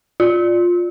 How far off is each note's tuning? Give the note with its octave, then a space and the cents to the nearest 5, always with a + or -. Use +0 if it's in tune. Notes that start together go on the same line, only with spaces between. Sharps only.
F4 +10